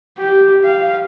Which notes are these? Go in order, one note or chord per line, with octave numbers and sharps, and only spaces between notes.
G4
F5